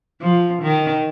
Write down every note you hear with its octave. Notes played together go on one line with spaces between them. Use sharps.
F3
D#3